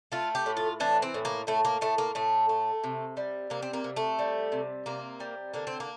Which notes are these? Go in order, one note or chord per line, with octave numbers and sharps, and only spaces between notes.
A3 F4
G4
A2
F4
E3 D4
C4
A2
A#3
A2 A3
A#3
A2 A3
A#3
A2 A3
A3
C3
G3
C3 A#3
C4
A#3
C3
A3
G3
C3
C3 A#3
G3
D3 A#3
C4
A#3